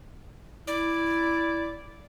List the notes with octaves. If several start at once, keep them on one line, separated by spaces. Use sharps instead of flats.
E4 D5